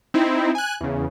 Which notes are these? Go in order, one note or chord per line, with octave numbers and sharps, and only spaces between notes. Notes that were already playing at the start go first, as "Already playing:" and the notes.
C4 D#4 E4
G#5 F#6
E2 C#3